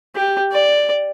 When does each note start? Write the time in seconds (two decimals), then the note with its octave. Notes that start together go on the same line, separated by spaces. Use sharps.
0.15 G4
0.52 D5